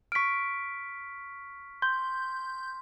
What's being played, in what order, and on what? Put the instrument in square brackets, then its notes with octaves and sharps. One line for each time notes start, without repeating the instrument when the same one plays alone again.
[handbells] C#6 D7 [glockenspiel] F6 B6
[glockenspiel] C6 [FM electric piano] G6